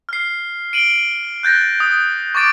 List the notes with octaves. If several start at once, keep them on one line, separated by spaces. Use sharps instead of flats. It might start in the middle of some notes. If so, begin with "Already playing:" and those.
F6 C7
D7 D#7 F#7 G7
F#6 G6 A6 A#6
D#6
C#6 D6 A6 D7